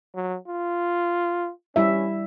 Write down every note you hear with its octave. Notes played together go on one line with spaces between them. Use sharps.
F#3
F4
G3 C#4 E4 E5